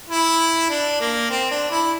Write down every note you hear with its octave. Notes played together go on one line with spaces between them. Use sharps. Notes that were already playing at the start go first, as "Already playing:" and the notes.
E4
D4
A#3
C4
D4
E4